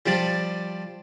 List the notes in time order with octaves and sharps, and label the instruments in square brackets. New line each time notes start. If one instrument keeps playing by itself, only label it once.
[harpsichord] F3 G3 D4 D5